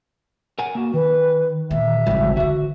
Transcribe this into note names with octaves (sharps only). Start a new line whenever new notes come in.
A#4 F#5 G#5
A#3 F#4
D#3 B4
A#2 E5
G#1 E2 C#3 E3 G3
D3 E3 F#4